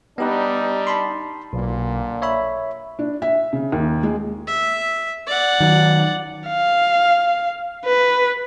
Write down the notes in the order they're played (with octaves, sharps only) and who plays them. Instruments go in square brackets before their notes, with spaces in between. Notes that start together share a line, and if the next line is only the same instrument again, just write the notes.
[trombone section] G3 D4 D#4 [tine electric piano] B3 G4 B4
[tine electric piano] A5 B5 C6
[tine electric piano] B1 [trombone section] A#2 D3 A#3
[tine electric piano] C#5 E5 B5
[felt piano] D4
E5
C#3
D#2
G#3
[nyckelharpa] E5
D5 F#5
[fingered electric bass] D#3 F#3
[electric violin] F5
B4